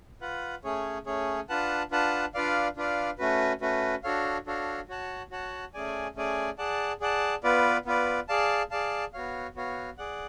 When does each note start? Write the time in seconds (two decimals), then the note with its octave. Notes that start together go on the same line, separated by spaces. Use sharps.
0.21 F4 B4 F#5
0.64 A3 C#4 G#4 C#5
1.06 A3 C#4 G#4 C#5
1.49 D4 F4 B4 F#5 A5
1.91 D4 F4 B4 F#5 A5
2.34 D4 F4 B4 D5 F5
2.76 D4 F4 B4 D5 F5
3.18 A3 C#4 F#4 B4
3.61 A3 C#4 F#4 B4
4.03 D4 F#4 A4 C#5 F5
4.47 D4 F#4 A4 C#5 F5
4.88 F#4 C#5 F#5 A5
5.31 F#4 C#5 F#5 A5
5.74 A3 C#4 G#4 D5 G#5
6.16 A3 C#4 G#4 D5 G#5
6.58 G#4 D5 F#5 A5
7.01 G#4 D5 F#5 A5
7.43 B3 F4 B4 D5
7.86 B3 F4 B4 D5
8.29 G#4 D5 F5 A5
8.71 G#4 D5 F5 A5
9.13 B3 F#4 C#5 F5
9.56 B3 F#4 C#5 F5
9.98 G#4 D5 F#5